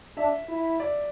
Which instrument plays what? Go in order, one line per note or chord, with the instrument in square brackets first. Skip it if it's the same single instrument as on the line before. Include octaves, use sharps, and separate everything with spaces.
[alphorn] D4 [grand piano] E5
[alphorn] E4
[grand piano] D5